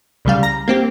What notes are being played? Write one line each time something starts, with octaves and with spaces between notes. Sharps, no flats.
C2 C#3 G3 F5
A#5 A#6
A#3 C4 G4